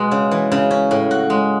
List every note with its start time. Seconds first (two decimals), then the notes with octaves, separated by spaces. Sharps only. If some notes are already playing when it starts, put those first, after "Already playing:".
Already playing: B2 G#3
0.11 C#3
0.31 E3
0.52 C#3
0.71 C#4
0.91 A2
1.11 F#4
1.30 G#3